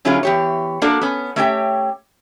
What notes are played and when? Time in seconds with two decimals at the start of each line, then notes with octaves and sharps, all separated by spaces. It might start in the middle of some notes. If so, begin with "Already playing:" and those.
0.05 D3 F#3 C#4 E4 F4 G#4
0.23 E2 G4 C#5
0.82 A#3 D4 F#4 A4 D5
1.01 B3 C#4
1.36 A3 C#4 G4 C#5 E5 G5